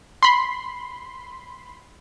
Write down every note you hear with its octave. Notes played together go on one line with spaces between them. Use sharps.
B5 C6